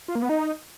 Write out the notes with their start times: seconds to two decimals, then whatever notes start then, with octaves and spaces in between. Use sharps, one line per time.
0.08 F4
0.15 A#3
0.22 B3
0.29 D#4